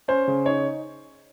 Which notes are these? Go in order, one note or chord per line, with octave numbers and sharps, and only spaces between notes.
C#4 C5
C#3
D#4 C#5